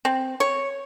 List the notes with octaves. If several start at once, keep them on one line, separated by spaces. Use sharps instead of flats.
C4
C#5